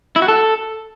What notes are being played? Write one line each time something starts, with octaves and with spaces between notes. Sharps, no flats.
E4
F#4
A4